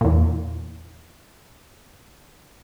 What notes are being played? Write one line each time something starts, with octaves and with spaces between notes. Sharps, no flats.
E2 A#2